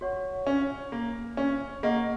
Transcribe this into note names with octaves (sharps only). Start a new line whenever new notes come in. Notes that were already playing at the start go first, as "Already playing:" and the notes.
F#4 C#5 F#5 C#6
C#4
A#3
C#4
A#3 G#4 D#5 F#5 C#6